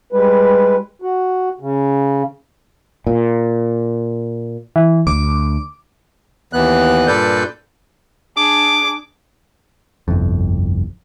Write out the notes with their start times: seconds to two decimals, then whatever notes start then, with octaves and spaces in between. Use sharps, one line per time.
0.13 G3 G#3 B4
1.02 F#4
1.60 C#3
3.07 A#2
4.76 E3
5.07 D2 D6
6.53 D#2 E3 B3 F#6
7.07 G2 A#2 A4 B4 D5 G6
8.37 D4 G#4 D6
10.08 G1 C2 F2